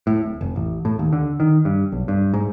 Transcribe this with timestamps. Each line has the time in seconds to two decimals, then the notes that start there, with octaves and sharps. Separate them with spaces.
0.07 A2
0.22 D1
0.41 F1
0.56 A1
0.85 A2
0.99 D#2
1.13 D3
1.40 D#3
1.65 G2
1.92 B1
2.08 G2
2.34 G#2